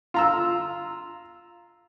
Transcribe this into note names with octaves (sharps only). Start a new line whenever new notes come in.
F4 A#5 E6